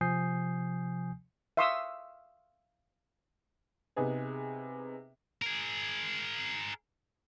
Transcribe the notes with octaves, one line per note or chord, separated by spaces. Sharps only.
C3 F3 G#5 D#6 G6 C7
E5 F5 C6 C#6 D#6 E6
C3 B3 D#4 G#4 B4
G#4 A#4